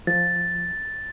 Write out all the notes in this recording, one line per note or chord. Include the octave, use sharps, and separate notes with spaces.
F3 A6